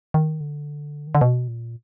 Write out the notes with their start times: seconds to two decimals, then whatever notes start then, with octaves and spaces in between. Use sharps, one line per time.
0.14 D#3
0.41 D3
1.07 D#3
1.15 D3
1.21 B2
1.48 A#2